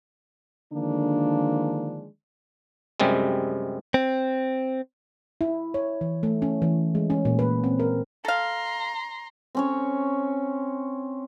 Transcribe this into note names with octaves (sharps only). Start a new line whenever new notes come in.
D3 D#3 F3 G#3 A#3 D4
F#2 C3 G3 G#3
C4
E4
C#5
E3
A3
C#4
E3
G#3
C#4
A#2
B4
C4
A#4
A4 F5 A#5 C6
C4 C#4 C#5